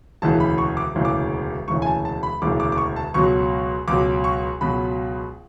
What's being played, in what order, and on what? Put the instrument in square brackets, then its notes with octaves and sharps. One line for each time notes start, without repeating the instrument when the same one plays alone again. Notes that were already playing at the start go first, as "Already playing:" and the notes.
[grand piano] E1 D2 C#3 E3 A5
B5
C#6
D6
E1 D2 C#3 E3
D6
E1 D2 C#3 E3 C#6
G#5
A5
A5
B5
E1 D2 C#3 E3 D6
D6
D6
C#6
A5
C#2 B2 F#3 C#6
C#2 B2 F#3 D6
C#6
C#2 B2 F#3 B5